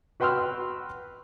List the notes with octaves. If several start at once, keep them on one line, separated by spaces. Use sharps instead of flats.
F#4 B4 G5 C6 E6 F6